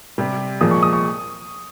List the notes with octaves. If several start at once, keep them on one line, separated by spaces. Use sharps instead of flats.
C3 G3
A#2 F3 G#3 D#6
C#6
D#6
C#6